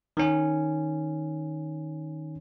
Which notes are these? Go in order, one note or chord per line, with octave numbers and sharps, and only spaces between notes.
D#3 C#4